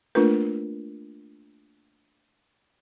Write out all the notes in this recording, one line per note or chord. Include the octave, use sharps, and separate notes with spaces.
A3 A#3 D4 F4 A#4 B4